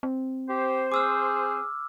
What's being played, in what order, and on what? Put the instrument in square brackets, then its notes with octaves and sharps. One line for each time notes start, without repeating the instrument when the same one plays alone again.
[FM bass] C4
[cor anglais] G4 [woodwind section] C5
[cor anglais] G#4 [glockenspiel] D6 E6 F6